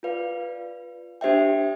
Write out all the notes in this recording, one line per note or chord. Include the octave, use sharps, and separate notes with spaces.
F4 B4 D5 F5
D4 G4 C5 E5 G5